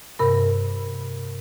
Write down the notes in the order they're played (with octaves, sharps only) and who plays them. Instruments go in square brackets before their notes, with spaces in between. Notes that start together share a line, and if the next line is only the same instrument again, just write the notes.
[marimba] G2 C3 A#4 B5